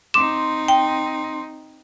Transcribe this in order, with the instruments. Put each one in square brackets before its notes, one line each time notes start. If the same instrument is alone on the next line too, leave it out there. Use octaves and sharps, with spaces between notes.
[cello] C4 D#4 [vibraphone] C6 [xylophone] D6 E7
[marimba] G5